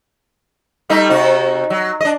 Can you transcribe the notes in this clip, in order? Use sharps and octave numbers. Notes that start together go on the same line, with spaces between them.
G3 A3 D#4
C3 D#4 F#4
F#3
D4 D#5